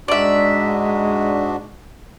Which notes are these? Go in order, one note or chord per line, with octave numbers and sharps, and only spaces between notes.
G#2 G#3 D4 F#4 D5 E5